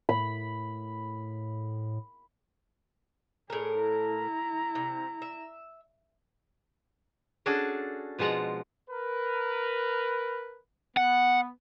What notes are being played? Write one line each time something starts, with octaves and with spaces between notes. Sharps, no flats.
A2 B5
A2 G#4 A#4
E4 A#5
C3
E5
C#4 D4 F#4 G#4 A4
B2 F3 G#3 F#5 A#5
A#4 B4
B3 F#5